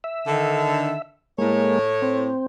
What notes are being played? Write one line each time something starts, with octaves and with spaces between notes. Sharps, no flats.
E5
D3 D#3
A2 G#3 A#3 C#5
C4